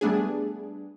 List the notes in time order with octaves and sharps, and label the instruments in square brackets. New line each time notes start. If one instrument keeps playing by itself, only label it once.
[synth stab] G3 A3 B3 D4 G#4